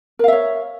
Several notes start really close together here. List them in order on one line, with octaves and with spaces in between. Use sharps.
A#4 F5 E5 C#5